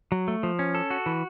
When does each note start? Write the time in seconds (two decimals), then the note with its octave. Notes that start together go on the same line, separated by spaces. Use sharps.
0.12 F#3
0.28 A3
0.43 F3
0.59 C#4
0.75 A4
0.90 F#4
1.06 E3